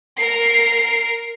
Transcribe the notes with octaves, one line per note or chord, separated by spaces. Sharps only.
A#4 C7